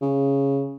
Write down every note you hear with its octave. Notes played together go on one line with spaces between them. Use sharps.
C#3